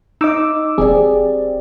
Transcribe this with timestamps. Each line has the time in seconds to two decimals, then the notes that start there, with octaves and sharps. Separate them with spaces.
0.21 D#4 D#5 D6 E6
0.78 E1 C4 G4 G#4 D5